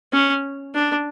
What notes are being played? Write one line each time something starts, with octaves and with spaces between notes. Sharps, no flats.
C#4
D4